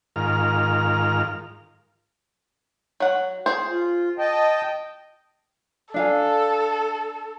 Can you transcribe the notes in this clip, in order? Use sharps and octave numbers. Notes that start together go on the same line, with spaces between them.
G#2 D#3 F4 A#4 F6
F#3 F#5
G#4 C5
F4
D#5 G5 A5
D4 A4 F5 G#5